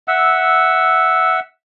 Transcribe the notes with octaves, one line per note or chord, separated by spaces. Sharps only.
E5 F#5 E6